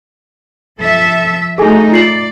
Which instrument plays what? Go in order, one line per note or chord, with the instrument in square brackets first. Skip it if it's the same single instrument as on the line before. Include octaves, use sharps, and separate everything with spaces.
[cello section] F3 A4 E5
[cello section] A3 D#4 F#4 [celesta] G#4 A4 G#5
[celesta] F4 C7 F#7 [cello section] D5